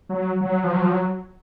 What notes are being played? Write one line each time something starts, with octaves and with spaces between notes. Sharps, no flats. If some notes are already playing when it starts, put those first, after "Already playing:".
F#3
F#3
F3
F#3
F3
F#3